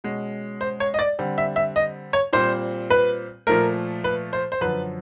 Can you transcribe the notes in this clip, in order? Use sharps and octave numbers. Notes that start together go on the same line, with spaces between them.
B2 G#3 C#4
C5
C#5
D#5
D5
D3 G3 C4
E5
E5
D#5
C#5
A#2 G3 C4 C5
B4
A#2 F3 A3 A#4
B4
C5
C5
F#2 D3 F3 B4